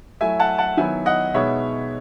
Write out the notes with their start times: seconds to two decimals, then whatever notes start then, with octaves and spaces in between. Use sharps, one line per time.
0.21 F#3 A3 E4 E5 G#5
0.40 F#5 A5
0.58 F#5 A5
0.77 D#3 F#3 B3 E4 E5 G#5
1.06 D#5 F#5
1.34 B2 G#3 B3 D#4 C#5 E5